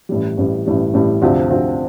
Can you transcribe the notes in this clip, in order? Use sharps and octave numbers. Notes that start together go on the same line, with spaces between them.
A1 A2 G3
A1 A2 G3
A1 A2 G3
A1 A2 G3
D2 C3 F3 C4
D2 C3 F3 C4